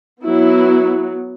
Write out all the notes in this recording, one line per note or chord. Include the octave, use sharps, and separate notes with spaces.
F#3 B3 E4